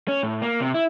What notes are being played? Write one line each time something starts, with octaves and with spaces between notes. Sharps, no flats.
C#4
A2
A#3
C3
E4